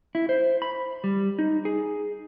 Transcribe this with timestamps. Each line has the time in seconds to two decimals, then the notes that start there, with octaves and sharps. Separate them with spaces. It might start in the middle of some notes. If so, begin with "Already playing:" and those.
0.15 E4
0.29 C5
0.62 B5
1.04 G3
1.39 D#4
1.65 G#4